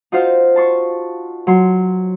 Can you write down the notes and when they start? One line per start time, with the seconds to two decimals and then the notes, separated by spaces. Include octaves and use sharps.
0.12 D#4 F4 F#4 C5 F5
0.56 A5 C6 C#6
1.47 F#3 C6